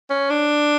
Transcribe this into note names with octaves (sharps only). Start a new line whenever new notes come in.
C#4
D4